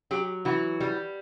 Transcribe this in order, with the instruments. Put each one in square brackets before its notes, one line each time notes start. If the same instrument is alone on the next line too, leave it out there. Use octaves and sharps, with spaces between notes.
[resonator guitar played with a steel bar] F#3 G4
E3 F#4
G3